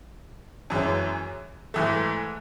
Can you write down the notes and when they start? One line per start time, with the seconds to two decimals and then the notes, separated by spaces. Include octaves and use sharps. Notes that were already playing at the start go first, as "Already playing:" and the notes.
0.70 F#2 E3 G#3 C#4
1.74 G#2 E3 A3